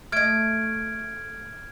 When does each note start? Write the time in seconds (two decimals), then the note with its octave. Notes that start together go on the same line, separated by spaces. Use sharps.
0.12 A3 D#5 F6 G#6 D7